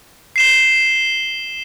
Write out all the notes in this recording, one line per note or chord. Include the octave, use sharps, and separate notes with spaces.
C7 E7 G7